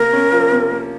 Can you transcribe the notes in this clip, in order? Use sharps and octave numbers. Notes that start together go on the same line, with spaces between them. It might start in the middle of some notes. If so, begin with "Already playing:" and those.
Already playing: C3 A#3 A#4
C#4
F3
C3
A#3